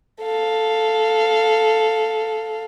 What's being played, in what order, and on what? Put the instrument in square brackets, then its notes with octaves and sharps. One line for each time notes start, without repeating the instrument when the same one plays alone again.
[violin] A4 F5